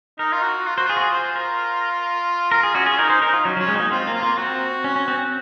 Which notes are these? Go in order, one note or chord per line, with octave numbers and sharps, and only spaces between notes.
D#4 A#4
F4
F#4
F4
F#4 C5
F4 G#4
F#4
G#4
C5
A#4
F4 A#4
G#4
C#4 F#4
G#4
C#4
D#4 A#4
C5
D#4 A#4
F4
F#3 C#4
F#3
C#4
G#3
A#3 C4 D#4
C4 F4
A#3
F4
A#3
C4 F#4
C#4
C#4
C4
C4